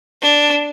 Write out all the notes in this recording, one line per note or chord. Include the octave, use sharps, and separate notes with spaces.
D4